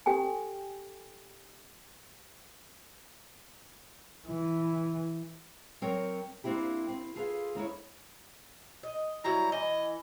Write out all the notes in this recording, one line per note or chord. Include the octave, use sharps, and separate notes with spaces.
G4 A4 G5 G#5
E3
F#3 C4 A#4 C#5 G5
A#3 C4 D4 E4 G4
C4
F4 G#4 A4 B4 E5 F5
D#2 D#4 E4 C#5
D#5
F#3 G3 E4 A#5
E3 D#5